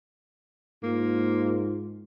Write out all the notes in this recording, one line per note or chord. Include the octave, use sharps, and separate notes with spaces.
G#2 A#3 F4